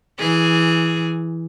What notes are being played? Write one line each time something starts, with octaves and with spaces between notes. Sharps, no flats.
E3 G#4